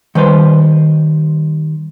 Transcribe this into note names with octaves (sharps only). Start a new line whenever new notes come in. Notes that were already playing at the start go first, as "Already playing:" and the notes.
D#3 G3 B4 C5